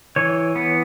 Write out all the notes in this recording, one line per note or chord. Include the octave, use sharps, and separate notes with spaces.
E3 C#5
B3